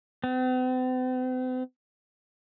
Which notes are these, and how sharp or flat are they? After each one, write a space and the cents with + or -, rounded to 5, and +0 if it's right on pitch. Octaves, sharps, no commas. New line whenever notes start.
C4 -45